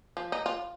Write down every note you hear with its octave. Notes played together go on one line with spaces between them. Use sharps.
F3
D#4
F4